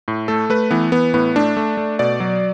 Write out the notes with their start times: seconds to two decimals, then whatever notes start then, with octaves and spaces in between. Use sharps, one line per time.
0.08 A2
0.28 A3 A4
0.50 A3 B4
0.71 E3 B3
0.92 E3 B3
1.14 A2 B3
1.36 A3 D4
1.57 A3
1.77 A3
1.99 B2 D5
2.20 F#3